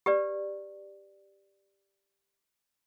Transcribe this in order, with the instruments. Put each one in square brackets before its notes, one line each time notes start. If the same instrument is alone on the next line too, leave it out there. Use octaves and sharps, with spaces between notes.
[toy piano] G4 B4 D5